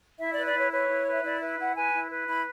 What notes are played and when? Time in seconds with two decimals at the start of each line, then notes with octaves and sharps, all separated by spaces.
0.19 E4 E5
0.32 B4 D5
0.46 D5
0.54 E4 C#5
0.71 B4 C#5
0.89 E4
1.07 B4
1.13 E5
1.24 E4 D5
1.41 B4 E5
1.58 E4 F#5
1.76 B4 G#5
1.93 E4
2.10 B4
2.28 E4 B5